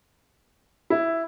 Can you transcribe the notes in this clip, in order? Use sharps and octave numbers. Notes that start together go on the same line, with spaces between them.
E4